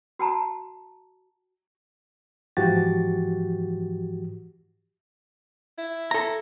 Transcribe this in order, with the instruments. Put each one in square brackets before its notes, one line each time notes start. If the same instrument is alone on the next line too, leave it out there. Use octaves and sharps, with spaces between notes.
[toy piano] F#4 G5 A5 A#5
[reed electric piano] G#2 E3 F3 F#4 G4 A6
[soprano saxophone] E4
[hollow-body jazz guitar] A4 A#5